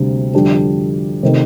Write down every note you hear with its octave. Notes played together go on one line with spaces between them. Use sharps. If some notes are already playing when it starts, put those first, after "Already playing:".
Already playing: D2 C3 G3 A#3 D4
F2 D3 G3 D4 G4
C3 D#3 A3